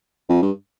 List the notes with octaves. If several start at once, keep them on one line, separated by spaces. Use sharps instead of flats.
F2
G2